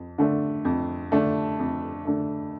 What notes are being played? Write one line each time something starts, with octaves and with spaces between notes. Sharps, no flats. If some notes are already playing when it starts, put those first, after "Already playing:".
Already playing: F2
D3 A3 D4
F2
D3 A3 D4
F2
D3 A3 D4